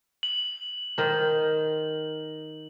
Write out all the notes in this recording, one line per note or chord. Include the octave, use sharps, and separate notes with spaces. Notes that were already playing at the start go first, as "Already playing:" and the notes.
F#7
D#3 C5